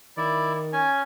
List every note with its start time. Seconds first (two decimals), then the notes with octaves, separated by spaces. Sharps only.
0.17 D#3 E4 D5
0.73 C#4 G#5